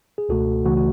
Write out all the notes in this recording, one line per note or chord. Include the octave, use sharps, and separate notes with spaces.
G#4
C#2 B2 A3 F#4 A4
C#2 C#3 E3 A3 F#4
F#4